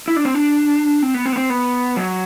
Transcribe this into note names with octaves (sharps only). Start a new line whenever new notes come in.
E4
D4
C4
D4
C4
B3
C4
B3
C4
B3
F#3